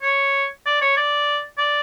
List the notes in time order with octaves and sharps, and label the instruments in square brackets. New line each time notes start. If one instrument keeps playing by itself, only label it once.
[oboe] C#5
D5
C#5
D5
D5